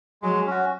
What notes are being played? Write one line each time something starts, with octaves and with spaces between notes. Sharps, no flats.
F#3 G#3
C#4 F#4